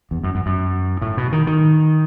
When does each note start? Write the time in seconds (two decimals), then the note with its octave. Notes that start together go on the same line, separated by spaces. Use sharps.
0.11 E2
0.23 F#2
0.35 F#2
0.46 F#2
1.01 A2
1.17 B2
1.32 D#3
1.47 D#3